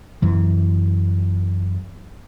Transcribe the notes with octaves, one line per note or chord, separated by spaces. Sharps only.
F#2 E3